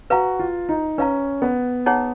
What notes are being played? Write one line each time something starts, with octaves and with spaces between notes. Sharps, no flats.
F#4 B4 F5 A#5
F4
D#4
C#4 B4 F5 A#5
B3
D#4 G#4 C#5 F#5 A#5